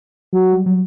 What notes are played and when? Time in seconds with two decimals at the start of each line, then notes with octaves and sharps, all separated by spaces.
0.33 F#3 F#4
0.52 G3
0.66 F#3